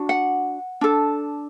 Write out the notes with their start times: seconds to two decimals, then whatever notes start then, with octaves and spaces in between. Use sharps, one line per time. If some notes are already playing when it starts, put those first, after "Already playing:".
Already playing: D4 F#4
0.09 F#5
0.81 D4 A4